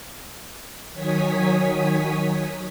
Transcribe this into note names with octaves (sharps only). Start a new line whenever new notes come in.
D#3 F#3 C#5 G#5 D#6 B6